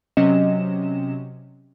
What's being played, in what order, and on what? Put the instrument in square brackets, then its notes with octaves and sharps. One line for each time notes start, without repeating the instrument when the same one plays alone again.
[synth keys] C3 F#3 C#4 D#5 E7